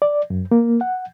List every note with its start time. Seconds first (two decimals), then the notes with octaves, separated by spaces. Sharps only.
0.02 D5
0.30 F#2
0.51 A#3
0.81 F#5